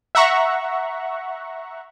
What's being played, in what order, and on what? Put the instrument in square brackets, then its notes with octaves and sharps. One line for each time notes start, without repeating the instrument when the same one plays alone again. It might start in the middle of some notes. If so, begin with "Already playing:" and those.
[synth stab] E5 F#5 A#5 C#6